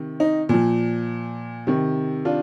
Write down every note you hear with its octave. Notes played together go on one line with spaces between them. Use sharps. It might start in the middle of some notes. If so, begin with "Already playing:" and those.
Already playing: C3 D#3
D#4
A#2 F3
C3 D#3
D4 F4